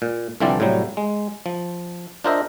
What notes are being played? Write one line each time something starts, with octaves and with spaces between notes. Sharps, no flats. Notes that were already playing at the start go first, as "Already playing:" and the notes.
A#2
C2 D3 E3 F3 C4 D5
A2 C3 F#3 G3
G#3
F3
D4 F4 A#4 C5 D#5 E5